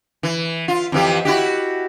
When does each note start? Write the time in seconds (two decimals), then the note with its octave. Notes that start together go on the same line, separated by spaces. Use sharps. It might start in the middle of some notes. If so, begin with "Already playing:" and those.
0.23 E3
0.68 F4
0.92 F2 E3 G4
1.25 E4 F#4 G4